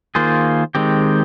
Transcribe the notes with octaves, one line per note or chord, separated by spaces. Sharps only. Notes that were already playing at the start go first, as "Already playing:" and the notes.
D#3 A#3 F4 G#4 C5
D#3 G#3 C4 G4